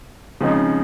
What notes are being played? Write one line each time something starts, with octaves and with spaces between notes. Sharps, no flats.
C#3 F3 G#3 C4 D#4